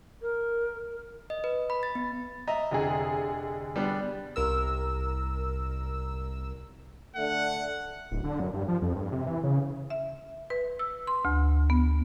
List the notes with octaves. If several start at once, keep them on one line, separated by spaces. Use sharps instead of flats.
A#4
D#5
B4
B5
A6
B3
D#5 E5 A#5
F1 D3 G#4
G3 B3 D4
C2 A#4 E6
D3 A3 F#5
D1
D3
F#2
G2
F3
F2
G2
C3
E3
C#3
E5
B4
E6
C6
D2
B3